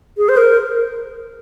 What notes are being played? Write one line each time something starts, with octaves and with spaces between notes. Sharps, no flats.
G#4
C5
A#4